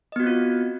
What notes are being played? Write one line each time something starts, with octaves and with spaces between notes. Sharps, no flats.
B3 C4 F4 F#4 D#5